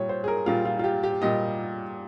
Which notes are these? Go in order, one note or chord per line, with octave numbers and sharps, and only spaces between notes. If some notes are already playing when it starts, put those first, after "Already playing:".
Already playing: A#2 G3 C#5
C5
G#4
A#4
A#2 G3 F4
F4
F4
G4
G4
A#2 G3 D#5